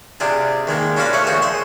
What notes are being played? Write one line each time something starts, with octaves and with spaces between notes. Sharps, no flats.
C3 D4 F4 G#4
D#3 G#3 A#3
C#4 D4 F4 F#4 F5 B5
A3 G#4 A4 C#5 E5
D#2 F3 F#4 C#6 D#6
G#4 E5 C6